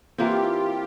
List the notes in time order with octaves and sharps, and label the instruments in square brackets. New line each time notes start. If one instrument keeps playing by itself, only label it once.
[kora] E3 A#3 C4 [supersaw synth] F4 G4